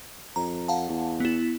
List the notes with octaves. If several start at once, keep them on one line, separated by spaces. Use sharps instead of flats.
F2 A#5
F5 F#5 A5
E2
B3 E4